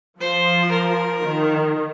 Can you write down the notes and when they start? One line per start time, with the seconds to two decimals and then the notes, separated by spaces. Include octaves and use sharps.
0.20 F3 C5
0.72 A#4
1.24 D#3